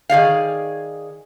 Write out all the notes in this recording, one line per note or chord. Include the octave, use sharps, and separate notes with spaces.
D#3 G#4 D5 F5